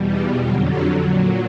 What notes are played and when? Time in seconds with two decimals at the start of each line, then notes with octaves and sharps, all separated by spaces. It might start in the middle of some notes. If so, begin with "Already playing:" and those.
Already playing: E2 B2 G3
0.08 D#4 F4
0.39 F2 D3 F#3 F4 G4
0.70 F4 G4
1.01 A#2 F#3